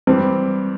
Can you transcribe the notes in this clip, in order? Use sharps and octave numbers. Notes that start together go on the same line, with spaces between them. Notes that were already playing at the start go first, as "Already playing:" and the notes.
G2 E3 G3 C4